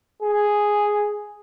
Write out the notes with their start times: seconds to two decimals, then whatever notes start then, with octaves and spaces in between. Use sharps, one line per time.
0.22 G#4